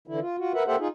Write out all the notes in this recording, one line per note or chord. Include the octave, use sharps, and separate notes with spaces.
D3 E3 E4
F4
F4 F#4
A#4 B4 E5 F#5
A#3 G4 A4 C5 E5 F#5
D#4 F4 G#4